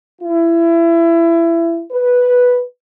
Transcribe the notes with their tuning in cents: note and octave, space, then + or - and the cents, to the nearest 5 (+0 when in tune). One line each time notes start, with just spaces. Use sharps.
E4 +25
B4 -5